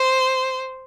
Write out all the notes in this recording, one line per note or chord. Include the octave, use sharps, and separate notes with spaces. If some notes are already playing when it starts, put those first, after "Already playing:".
Already playing: C5